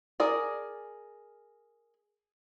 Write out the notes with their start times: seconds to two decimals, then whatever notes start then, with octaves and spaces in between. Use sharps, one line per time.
0.20 G#4 A#4 D5